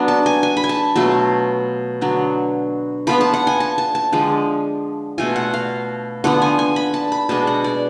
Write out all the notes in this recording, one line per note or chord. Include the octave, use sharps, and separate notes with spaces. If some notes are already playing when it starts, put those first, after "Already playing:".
Already playing: F#3 B3 D4
A5
G#5
G#5
B5
G#5
A5
B2 F#3 A3 F4 A5
D3 F#3 B3
F3 B3 F4 B5
A5
F#5
G#5
A5
A5
A5
D3 F3 G#3
B2 A3 F4 G#5
F#5
F5
D3 F3 B3 F#5
G#5
G#5
B5
A5
B5
B2 G#3 B3 D4 A5
F#5
D5